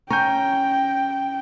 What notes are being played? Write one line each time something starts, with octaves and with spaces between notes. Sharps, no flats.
C#4 G5 A#5 G6